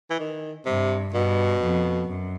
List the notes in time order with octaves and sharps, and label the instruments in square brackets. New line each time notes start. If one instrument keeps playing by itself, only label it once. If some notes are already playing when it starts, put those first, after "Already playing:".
[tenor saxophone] E3
D#3
[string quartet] G2 [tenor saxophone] C3
[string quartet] G2 [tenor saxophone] B2
[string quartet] F2
F#2